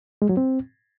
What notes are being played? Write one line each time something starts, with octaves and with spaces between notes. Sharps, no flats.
G#3
F#3
C4